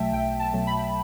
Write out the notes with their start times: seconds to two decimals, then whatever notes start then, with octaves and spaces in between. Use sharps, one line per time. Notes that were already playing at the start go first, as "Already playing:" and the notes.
Already playing: B1 B2 F#3 A3 E5 G5 A5
0.12 B1 G5
0.40 A5
0.53 B2 F#3 A3
0.67 B5